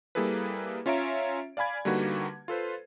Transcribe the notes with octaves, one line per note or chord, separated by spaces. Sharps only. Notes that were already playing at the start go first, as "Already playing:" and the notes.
G3 A#3 E4 G#4 A4 B4
C#4 F4 C#5 E5 A#5 D7
D5 F5 G#5 B5 G#6
D3 G3 A#3 D#4 F#4 B4
F4 A4 B4 C5